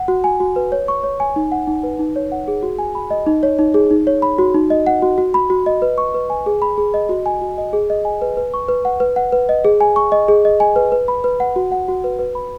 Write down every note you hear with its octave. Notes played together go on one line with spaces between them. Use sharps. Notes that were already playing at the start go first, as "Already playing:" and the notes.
Already playing: F#5
F#4
G#5
F#4
B4
C#5
C#6
C#5
G#5
D#4
F#5
D#4
B4
D#4
C#5
F#5
G#4
F#4
G#5
B5
D#5
D#4
C#5
D#4
G#4
D#4
C#5
B5
F#4
D#4
D#5
F#5
F#4
F#4
B5
F#4
D#5
B4
C#6
B4
G#5
G#4
B5
G#4
D#5
F#4
G#5
F#4
D#5
G#4
D#5
G#5
B4
B4
C#6
B4
F#5
B4
F#5
B4
D#5
G#4
G#5
C#6
D#5
G#4
D#5
G#5
B4
B4
B5
B4
F#5
F#4
F#5
F#4
B4
B4
B5